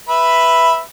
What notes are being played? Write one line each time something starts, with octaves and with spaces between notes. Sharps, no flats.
B4 E5 B5